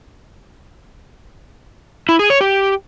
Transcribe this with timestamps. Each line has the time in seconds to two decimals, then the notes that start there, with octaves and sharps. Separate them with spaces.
2.09 E4
2.19 G#4
2.30 C#5
2.41 G4